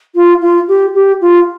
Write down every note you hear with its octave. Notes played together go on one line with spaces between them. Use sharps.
F4
F4
G4
G4
F4